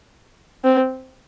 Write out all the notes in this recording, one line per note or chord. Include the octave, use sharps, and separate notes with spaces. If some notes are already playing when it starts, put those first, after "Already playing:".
C4